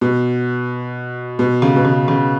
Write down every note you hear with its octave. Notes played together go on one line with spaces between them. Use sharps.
B2
B2
C#3
B2
C#3
C#3